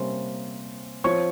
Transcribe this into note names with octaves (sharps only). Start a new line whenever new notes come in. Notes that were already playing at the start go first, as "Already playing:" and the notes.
Already playing: C3 G3 A#3 C#4 C5 C6
F3 C4 C#5 C#6